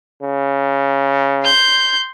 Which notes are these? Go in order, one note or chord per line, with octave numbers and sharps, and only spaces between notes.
C#3
C6 G6